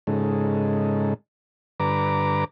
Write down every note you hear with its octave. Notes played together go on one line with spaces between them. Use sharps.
G#2 C#3 G#3 D#4 A4
G2 D3 B4 A#5 D6